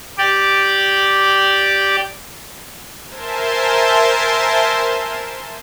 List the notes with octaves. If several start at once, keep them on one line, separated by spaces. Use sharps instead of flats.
G4 D5
A#4 C5 E5 G#5 A5 C6